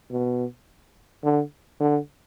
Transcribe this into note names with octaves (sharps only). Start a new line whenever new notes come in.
B2
D3
D3